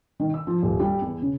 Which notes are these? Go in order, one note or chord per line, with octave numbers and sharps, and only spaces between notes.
D#3
E6
F3
D#1
G3
E2
C#3